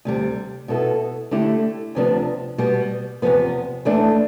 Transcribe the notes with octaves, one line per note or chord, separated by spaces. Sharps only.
D2 C3 G3
B2 B3 E4 A4
D3 A3 E4 G4
D2 C3 F3 B3 D4
B2 G3 B3
E2 C3 F3 B3
E3 A3 D4